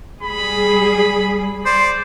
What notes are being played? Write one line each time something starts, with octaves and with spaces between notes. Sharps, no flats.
G3 G#4 B5
C5 D5